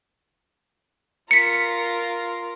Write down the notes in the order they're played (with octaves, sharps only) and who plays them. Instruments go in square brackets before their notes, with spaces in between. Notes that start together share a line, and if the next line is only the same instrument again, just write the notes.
[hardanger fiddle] F4 A#4 [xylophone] B6 C#7